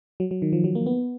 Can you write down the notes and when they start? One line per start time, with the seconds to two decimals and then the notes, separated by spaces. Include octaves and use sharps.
0.20 F#3
0.31 F#3
0.42 D#3
0.53 F3
0.64 F#3
0.75 A#3
0.86 B3